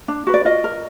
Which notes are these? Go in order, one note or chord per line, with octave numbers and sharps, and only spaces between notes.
D4
F#4 B4
D5
F4 D#5
A#4